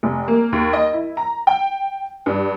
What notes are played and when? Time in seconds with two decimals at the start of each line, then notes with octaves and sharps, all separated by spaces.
0.03 F1
0.28 A#3
0.52 D#2
0.73 D#5
0.93 E4
1.17 A#5
1.47 G5
2.26 G2